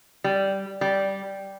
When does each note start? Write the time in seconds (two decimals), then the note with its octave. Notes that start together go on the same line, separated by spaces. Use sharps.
0.24 G3
0.81 G3